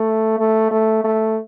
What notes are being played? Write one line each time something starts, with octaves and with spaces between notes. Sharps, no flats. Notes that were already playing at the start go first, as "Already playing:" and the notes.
Already playing: A3
A3
A3
A3